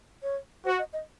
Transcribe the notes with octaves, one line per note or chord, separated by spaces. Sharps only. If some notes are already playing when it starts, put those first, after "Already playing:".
C#5
F#4 C5
D#5
D#5